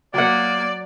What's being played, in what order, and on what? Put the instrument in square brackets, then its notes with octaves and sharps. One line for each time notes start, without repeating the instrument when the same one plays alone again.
[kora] F#3 F#5 [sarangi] A#3 [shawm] D5